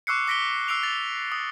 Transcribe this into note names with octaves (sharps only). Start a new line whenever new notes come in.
C#6 D6 E6 F#6 C7 C#7
D6 A#6 B6 D7 G7
E6 C7 D7 F7
A6 F7
D#6